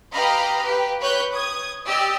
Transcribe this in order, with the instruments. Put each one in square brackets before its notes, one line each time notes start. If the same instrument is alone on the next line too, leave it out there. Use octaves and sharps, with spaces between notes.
[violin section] G4 B4 D#5 F5 A#5 B5
G4 B4
B4 C#5 F#6 G6
D#6 G#6
G4 D5 D#5 E6